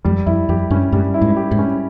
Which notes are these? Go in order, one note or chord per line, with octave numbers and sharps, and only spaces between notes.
F2 G3
F2 E4
F2 G4
G2 C#4
G2 G3
E4
G#2
G4
G#2
C#4